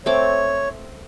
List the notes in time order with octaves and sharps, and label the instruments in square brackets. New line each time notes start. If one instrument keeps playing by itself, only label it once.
[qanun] A3 C4 D6 [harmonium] C#5